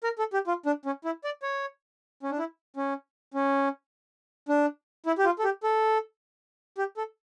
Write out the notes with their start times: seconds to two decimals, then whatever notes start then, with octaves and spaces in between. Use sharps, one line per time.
0.04 A#4
0.19 A4
0.33 G4
0.47 F4
0.66 D4
0.85 C#4
1.05 E4
1.24 D5
1.43 C#5
2.23 C#4
2.31 D4
2.39 E4
2.76 C#4
3.34 C#4
4.49 D4
5.06 E4
5.18 G4
5.25 F4
5.39 A4
5.44 G4
5.63 A4
6.78 G4
6.97 A4